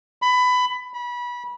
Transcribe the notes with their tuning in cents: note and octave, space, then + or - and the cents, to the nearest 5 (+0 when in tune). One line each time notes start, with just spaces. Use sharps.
B5 +20
B5 -25